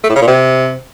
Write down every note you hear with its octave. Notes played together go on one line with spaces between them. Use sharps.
A3
A2
C#3
A#2
C3